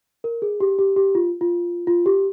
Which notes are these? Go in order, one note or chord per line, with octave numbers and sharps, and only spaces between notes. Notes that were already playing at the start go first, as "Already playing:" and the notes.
A#4
G#4
G4
G4
G4
F4
F4
F4
G4